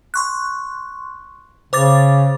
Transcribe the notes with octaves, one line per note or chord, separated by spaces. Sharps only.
C6 C#6 F#6
C#3 C5 D6 A6